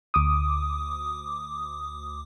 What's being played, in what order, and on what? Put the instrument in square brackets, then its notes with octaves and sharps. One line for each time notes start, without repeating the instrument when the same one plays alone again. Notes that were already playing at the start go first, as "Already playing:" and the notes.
[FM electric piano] D2 D6 D#6